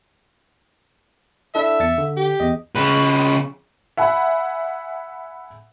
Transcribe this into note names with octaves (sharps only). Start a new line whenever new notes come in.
D4 E4 A4 E5
E2 A6 C#7
D3
G4
E2 D#5
C#3 B4
E5 F#5 G#5 B5